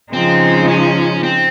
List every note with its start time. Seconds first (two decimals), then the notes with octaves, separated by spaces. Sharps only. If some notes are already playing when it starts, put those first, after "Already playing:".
0.13 C#3 F3 G#3 C4 D#4
0.68 C#4
1.23 C4